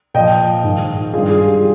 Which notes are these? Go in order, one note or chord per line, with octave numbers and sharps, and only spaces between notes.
A#2 F3 D#5 G5
G#2
D#3
G2 D#3 F4 G#4
F4 G#4
G4